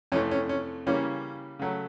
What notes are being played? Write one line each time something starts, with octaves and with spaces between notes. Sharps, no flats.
F2 C3 E3 A3 C#4
C#4
C#4
C#3 E3 G3 A#3 C#4
C#3 F#3 A3